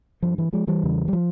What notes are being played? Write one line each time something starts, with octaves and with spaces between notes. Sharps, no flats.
G2 F3
E3
F3 G#3
E3 G3
E2 C#3
G3
F3